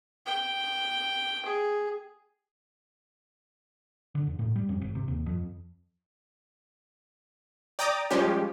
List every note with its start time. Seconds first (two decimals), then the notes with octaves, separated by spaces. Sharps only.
0.26 G5
1.45 G#4
4.15 D3
4.27 E2
4.39 A2
4.56 G3
4.69 F2
4.81 G#1
4.95 C3
5.08 D#2
5.26 F2
7.79 D5 G5 A#5 D6 D#6
8.11 F3 G3 G#3 C#4 G4